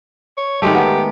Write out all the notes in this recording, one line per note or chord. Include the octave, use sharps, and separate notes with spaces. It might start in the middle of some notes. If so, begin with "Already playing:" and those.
C#5
D#3 G#3 A3 G4
B3